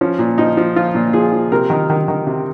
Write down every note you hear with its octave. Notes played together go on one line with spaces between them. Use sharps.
F3 C#4
A#2
F3 D#4
F3
F3 F4
A#2
F3 G#4
F3
C3 A#4
D#3
D#3
D#3
C3